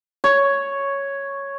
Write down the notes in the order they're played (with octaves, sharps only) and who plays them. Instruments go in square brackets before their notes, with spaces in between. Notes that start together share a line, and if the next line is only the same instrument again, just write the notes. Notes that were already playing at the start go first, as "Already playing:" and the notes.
[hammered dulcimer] C#5